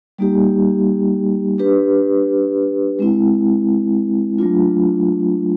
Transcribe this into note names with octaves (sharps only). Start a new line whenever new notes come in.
G3 A#3 D#4 G4
D4 G4 B4
G#3 C4 E4
F#3 A3 D4 F4